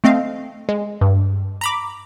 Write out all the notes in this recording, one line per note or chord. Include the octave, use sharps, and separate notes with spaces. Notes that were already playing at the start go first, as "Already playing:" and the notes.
A3 C4 D#5 F5
G#3
G2
A#5 B5 D6